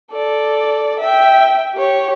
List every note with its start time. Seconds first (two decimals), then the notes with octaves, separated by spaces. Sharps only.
0.11 A4 D5
1.00 E5 G5
1.76 G4 C#5